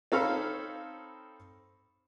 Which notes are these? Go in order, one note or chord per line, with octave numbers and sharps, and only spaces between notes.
C4 D#4 A4 C#5 F5 B5